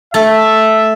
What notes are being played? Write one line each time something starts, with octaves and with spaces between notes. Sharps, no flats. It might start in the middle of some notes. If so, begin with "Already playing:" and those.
A3 A4 E5